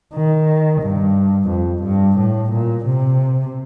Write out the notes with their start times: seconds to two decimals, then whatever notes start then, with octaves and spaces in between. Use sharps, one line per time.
0.14 D#3
0.82 G2
1.49 F2
1.84 G2
2.18 A2
2.52 A#2
2.86 C3